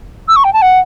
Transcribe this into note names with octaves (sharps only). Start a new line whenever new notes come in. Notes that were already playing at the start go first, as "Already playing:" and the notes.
E6
C#6
G5
A5
F#5